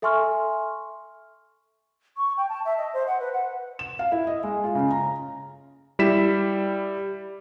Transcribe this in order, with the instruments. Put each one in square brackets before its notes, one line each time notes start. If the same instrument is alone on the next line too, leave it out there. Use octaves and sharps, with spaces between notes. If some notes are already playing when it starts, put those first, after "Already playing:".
[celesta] A4 E5 G#5 C6 C#6 F6
[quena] C#6
G5
A5
E5
D#5
C5
F#5
B4
F#5
[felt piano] E7
F5
E4
D#5
G#3
F4
C#3
A#5
[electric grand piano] G3 E4 B6 E7